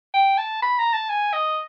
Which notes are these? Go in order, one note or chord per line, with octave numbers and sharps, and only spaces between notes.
G5
A5
B5
A#5
A5
G#5
D#5